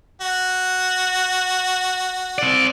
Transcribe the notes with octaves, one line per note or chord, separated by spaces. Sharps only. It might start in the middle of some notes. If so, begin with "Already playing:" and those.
F#4
C4 D5